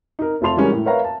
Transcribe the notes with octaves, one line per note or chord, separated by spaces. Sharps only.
D#4 A#4
F1 A3 F4 A5 C6 F7
E3 G3 G#3 C#4 F#4 A#4
A2
A#4 B4 C#5 E5 F5 A#5
A5